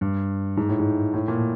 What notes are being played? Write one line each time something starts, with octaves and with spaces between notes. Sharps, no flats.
G2
G#2
A2
G#2
A2
A#2